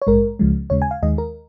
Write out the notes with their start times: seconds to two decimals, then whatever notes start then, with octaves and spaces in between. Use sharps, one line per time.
0.02 C#5
0.07 A#1 G#2 G#3 A#4
0.39 C#2 C#3 F3 G#3
0.70 D#2 C#3 G#3 C#5
0.82 G#5
0.91 F5
1.02 D#2 D#3 G#3 D#5
1.18 A#4